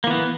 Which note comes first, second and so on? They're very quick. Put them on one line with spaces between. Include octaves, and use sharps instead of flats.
A#3 E3 B3